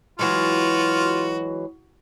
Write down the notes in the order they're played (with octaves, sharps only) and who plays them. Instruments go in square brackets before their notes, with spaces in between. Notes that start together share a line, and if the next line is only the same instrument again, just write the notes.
[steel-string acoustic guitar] E3 F#3 G#3 [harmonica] F4 [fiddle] F#4